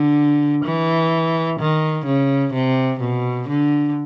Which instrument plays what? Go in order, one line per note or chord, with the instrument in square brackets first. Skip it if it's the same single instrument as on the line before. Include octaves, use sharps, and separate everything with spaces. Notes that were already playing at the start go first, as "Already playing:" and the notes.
Already playing: [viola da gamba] D3
E3
D#3
C#3
C3
B2
D3